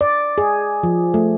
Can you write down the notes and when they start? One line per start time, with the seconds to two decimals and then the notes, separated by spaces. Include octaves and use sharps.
0.01 D5
0.38 G#4
0.83 F3
1.14 A3